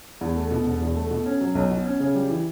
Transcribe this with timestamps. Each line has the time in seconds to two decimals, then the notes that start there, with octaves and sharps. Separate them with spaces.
0.21 E2
0.36 A3
0.51 B2
0.66 E1
0.81 E2
0.95 A3
1.11 B2
1.25 C#4
1.41 F#3
1.55 B1
1.71 B2
1.85 C#4
2.00 C#3
2.15 G3
2.29 E3